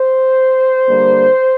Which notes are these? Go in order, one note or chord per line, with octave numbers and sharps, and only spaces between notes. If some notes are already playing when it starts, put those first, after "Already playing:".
Already playing: C5
D3 G3 A#3